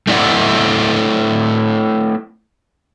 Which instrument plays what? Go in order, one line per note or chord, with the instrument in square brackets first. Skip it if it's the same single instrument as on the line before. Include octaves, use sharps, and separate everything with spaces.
[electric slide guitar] A3 C4 E4 D5 E5 F#5